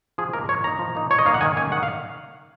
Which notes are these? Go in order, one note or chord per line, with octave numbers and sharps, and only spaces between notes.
F3 G#4
A#3 D#4 A#4
F3 C#5
A#3 D#4 A#5
F3
A#3 D#4
F3 C#5
D#5
A#3 D#4 F5
F#5
D#3 G#5
A#3 C#4 G#5
D#3 F#5
F5